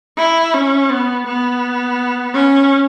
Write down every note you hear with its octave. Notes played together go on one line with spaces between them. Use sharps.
E4
C#4
B3
B3
C#4